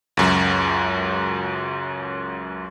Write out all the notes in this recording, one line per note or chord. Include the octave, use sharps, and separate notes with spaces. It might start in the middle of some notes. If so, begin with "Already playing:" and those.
C#2 F#2 F#3